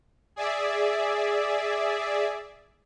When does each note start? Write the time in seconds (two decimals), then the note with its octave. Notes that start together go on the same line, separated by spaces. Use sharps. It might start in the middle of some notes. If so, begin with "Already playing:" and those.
0.36 G#4 D5 E5